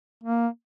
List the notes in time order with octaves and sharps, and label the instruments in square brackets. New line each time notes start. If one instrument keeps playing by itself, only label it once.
[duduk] A#3